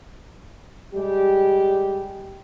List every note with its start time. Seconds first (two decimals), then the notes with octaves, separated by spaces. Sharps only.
0.95 G3 G#3 G4